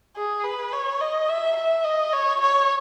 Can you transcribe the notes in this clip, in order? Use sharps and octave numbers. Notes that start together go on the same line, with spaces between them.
G#4
B4
C#5
D#5
E5
E5
D#5
C#5
C#5